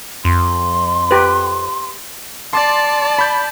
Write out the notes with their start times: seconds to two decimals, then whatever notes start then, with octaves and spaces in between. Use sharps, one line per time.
0.24 F2 C6
1.11 G4 B4
2.53 D5 A5 C6 D6 A6
3.19 B5 G6